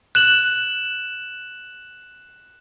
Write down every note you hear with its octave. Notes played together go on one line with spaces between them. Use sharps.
F#6 E7 F#7